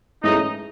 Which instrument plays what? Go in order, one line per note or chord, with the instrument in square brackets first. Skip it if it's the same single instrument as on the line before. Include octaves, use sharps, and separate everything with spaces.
[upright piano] G#2 E3 A3 C#4 G#4 [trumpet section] D#4 D#5